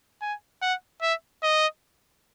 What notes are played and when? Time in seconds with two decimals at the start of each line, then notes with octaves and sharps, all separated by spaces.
0.22 G#5
0.62 F#5
1.02 E5
1.43 D#5